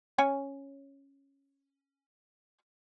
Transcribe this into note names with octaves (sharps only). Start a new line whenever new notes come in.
C#4 C#5 G#5